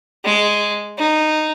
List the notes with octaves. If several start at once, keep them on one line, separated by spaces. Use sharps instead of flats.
G#3
D#4